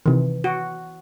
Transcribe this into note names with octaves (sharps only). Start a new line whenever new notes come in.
C3 D#3 E3
F#4